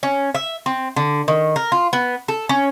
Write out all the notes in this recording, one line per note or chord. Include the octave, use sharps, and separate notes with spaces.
C#4
E5
C4
D3
D#3
A#4
F4
B3
A4
C#4